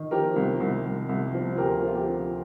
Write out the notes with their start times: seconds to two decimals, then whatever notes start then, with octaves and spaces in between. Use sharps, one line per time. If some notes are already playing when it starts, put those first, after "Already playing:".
Already playing: D#3
0.11 F3 G4 A#4
0.36 C2
0.60 C2
0.85 C2
1.09 C2
1.34 F3
1.58 D2 G4 A#4
1.83 F3 F4
1.95 G4
2.08 C3